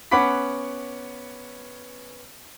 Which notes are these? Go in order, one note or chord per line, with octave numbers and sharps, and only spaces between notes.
B3 C#4 F#5 B5 D6 B6